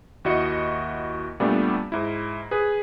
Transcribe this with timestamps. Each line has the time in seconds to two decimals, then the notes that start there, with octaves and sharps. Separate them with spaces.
0.25 D#2 E4 F#4 D#5 C#7
1.40 A#2 G3 A3 B3 D4
1.92 G#2 E4
2.51 G#4 B4